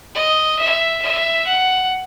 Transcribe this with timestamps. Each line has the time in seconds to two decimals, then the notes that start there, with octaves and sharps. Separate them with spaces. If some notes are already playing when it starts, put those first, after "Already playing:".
0.15 D#5
0.59 E5
1.02 E5
1.47 F#5